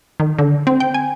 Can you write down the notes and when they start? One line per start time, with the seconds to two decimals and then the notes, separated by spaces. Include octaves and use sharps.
0.20 D#3
0.39 D3
0.67 C4
0.80 G5
0.94 G#5